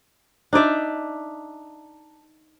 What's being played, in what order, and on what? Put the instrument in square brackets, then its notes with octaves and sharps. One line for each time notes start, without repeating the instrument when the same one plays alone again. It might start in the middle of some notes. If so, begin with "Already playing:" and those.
[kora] D4 D#4 D5 E5